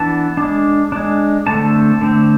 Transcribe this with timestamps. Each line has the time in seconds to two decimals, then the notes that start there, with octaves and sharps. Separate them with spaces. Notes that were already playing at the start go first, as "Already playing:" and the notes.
Already playing: E3 B3 D4 A5
0.37 G#3 D4
0.92 G#3 D4
1.46 D3 A3 C4 A5
2.01 D3 A3 C4